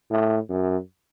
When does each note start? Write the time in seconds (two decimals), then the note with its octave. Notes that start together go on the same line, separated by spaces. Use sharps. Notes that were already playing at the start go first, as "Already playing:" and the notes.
0.11 A2
0.50 F#2